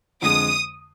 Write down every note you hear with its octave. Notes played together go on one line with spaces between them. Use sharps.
F2 D3 G#3 D#6